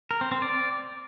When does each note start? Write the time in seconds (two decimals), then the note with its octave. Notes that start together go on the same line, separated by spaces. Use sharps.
0.11 A#4
0.21 C4
0.32 C4
0.42 D5